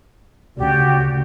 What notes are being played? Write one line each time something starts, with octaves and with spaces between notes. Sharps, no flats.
D2 C#3 F#4 G4 D5